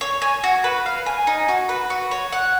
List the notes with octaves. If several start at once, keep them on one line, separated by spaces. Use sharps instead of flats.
C#5
G#5
F#4
B4
F5
G#5
D#4
F#4
B4
F#4
C#5
F#5